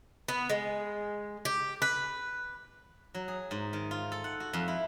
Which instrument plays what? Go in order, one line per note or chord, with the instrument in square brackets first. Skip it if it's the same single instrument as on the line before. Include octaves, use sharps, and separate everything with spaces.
[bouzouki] B3
G#3
G4
B4
[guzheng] F#3
G#4
G#2
D#3
F4
A4
F#5
F#4
F2
E4